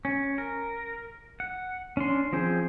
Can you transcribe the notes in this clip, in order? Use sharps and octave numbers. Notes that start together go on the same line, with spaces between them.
C#4
A#4
F#5
C#4 D4 C6
F3 C4 G#4 C5